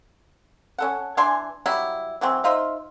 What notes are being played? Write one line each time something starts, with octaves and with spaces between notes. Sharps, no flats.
C#4 A4 F#5
E3 D4 G#5 C6
F#3 G3 E4
E3 F#3 C4
D#4 F4 C5 E5